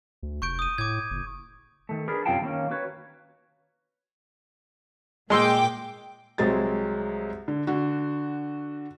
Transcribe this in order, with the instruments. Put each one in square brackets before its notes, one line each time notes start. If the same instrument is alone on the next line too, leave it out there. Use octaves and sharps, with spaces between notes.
[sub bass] D2
[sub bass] F1 [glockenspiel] C#6 G6 D7
[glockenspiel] D#6 D#7
[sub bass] A2 [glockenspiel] D6 G#6
[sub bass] F#1
[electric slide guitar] D#3 A3
D4 G#4 A#4 B4
F#2 C3 F4 F5 G5 A5
D#3 A#3 C#4
F#4 B4 C#5
[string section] A#2 G5 D6 [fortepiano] G#3 C6 E6
[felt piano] C2 F#3 G#3 C4 A6
D3
D3 F#4